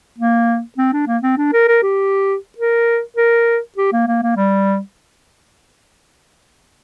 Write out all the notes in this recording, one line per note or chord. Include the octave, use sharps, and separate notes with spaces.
A#3
C4
D4
A#3
C4
D4
A#4
A#4
G4
A#4
A#4
G4
A#3
A#3
A#3
G3